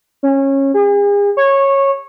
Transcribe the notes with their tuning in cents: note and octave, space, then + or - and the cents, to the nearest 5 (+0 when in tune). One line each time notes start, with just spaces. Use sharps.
C#4 -20
G#4 -40
C#5 -15